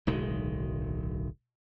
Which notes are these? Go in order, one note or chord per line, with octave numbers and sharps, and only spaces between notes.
D1 B1 D#3 G#3